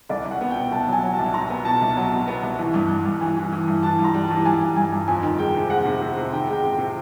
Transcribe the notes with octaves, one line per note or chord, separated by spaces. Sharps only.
C2 D5
C2
F#5
B3
G5
B2
C2 A5
F#3 G#5
F#3
A5
C2
B2 A#5
B3
B2 A5
C2
F#3
B2
B3
C2
E3
G2
G2
G2
E3 G#5
E3
E3
G2
E3 A5
G2
A#5
G3
A5
E3
G2 G#5
G2
G2 G#5
G2
F2 G#5
D#3
G#3 G5
C3
G#3 F#5
C3
C3
C3
D#3 G5
G#3 G5
C3
G5
C3